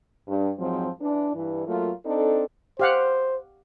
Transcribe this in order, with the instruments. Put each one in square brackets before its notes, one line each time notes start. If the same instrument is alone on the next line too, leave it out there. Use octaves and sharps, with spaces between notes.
[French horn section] G2
F2 G#2 F3 F#3 C4
E3 D4
G2 E3
F#3 A3 A#3 F4
C4 D4 D#4 A4
[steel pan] G4 F5 F#5 [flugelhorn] C5